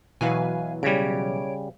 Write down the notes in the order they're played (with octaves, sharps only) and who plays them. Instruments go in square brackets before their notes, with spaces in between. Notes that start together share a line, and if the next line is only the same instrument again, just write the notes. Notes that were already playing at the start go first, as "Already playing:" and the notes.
[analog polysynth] B2 E3 F#3 [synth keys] B4 F5 G#5
[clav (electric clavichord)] C#3 G3 [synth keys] C#5 D7